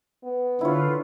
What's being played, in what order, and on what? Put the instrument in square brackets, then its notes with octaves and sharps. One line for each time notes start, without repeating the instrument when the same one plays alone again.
[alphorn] B3
[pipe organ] D3 [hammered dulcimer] E4 C#5 [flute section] F4 B4